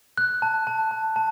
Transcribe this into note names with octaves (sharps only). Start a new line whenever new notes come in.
F#6
A5
A5
A5
A5